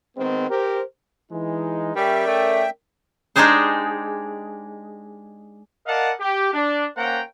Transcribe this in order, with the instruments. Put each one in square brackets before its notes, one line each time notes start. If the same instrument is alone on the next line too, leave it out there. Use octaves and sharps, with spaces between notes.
[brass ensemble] D#3 G#3 B3 C4
G4 A#4 C5
[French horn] E3 [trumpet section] G#3 D#4
[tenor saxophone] G3 [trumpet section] C#4 D5 [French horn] A#4 [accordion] E5 G5
[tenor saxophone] A3
[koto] G#3 D4 D#4 G4 G#4 C5
[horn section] A#4 D5 D#5 F5 F#5 A5
G4
D4
A#3 C#4 C5 F#5 G5 A#5